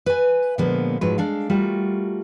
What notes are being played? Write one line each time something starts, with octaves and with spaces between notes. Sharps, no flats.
B4 G#5
A#2 D3 F3 G#3 A#3 B3
G#2 F3 F#3 B4
G#3 D4 A4 F5
G3 A3 F4 F#4 A#4